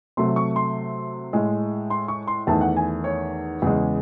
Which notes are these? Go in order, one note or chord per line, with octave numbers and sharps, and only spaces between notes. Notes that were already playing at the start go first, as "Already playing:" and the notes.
C3 F#3 A3 C6
C#6
C6
A2 G#3
C6
C#6
C6
E2 D#3 A3 A5
F#5
G#5
C#5
E2 C#3 G#3